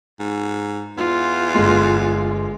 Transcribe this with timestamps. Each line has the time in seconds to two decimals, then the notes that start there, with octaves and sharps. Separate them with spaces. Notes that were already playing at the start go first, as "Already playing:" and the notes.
0.20 G#2
0.97 E2 F4
1.55 G1 G#3 A3 C6